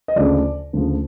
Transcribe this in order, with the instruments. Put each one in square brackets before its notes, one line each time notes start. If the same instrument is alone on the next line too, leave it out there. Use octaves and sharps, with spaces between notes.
[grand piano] D#5
D2 C#3 F3 D5
D2 C#3 F3